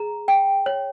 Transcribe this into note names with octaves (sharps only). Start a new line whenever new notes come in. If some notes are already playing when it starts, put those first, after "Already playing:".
Already playing: G#4 A#5
G5
C#5